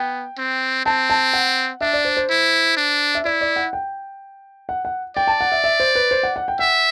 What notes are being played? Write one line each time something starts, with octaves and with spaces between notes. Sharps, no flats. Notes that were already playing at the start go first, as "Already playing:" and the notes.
Already playing: B3 G5
C4
C4 A5
A5
F#5
D4 E5
D5
C5
C5
E4
D4
E5
E4 D5
D5
F#5
G5
F#5
F#5
D5 G5
A5
F#5
E5
E5
C5
B4
C5
F#5
F#5
G5
E5 F#5